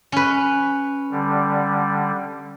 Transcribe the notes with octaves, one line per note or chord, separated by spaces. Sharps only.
C#4 B4
D3 G3